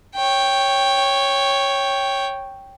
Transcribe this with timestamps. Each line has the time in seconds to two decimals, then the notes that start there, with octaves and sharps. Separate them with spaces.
0.16 C#5 G5